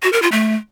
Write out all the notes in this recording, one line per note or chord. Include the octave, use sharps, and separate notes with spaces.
F#4
A#4
F4
A3